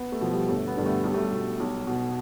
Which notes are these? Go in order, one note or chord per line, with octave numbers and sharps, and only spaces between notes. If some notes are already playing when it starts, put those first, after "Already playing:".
Already playing: B3
A3
B2 F3
G3
G1 A3
B3
G2 D3 G3
A3
B1 G3
A3
G3
B2
B1
B2